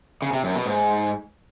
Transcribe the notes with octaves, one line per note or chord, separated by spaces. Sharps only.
C#3
C3
F#2
B2
G#2